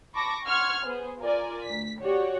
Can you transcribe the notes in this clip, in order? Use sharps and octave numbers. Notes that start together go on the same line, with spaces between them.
A5 B5 C#6 D6 A#6
F#5 C6 C#6 F6 G#6
B3 G#4 C5
F4 A#4 D5 G#5
D2 B6
F#4 G4 C#5 D5 F#5